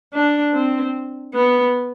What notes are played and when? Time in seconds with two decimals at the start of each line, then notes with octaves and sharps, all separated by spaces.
0.14 D4
0.54 C4
1.35 B3